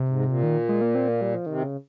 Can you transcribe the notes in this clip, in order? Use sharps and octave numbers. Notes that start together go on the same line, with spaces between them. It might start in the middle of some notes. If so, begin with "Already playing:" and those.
Already playing: C3
G#2
A#2
D#3
G#3
A#3
C4
A#3
G3
F3
C3 D#3
C#3